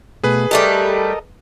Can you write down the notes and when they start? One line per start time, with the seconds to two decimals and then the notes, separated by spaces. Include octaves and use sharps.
0.24 B2 A3 G#4 B4
0.51 G3 A3 G4 A4 A#4 D#5